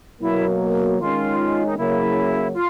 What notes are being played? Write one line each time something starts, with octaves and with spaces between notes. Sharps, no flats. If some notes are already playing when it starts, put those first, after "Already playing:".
B2 F#3 A#3 E4
D#3 G#3 C#4 F4
D#4
C#3 F#3 A#3 E4
F4